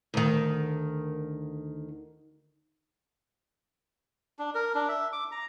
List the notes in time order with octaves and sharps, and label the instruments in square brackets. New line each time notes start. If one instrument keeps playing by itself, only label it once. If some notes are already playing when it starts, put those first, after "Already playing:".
[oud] D2 D#3
[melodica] D4
A#4
D4
E5
D6
A#5